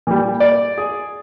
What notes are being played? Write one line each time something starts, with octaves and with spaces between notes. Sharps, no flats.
A#2 G3
D5
G#4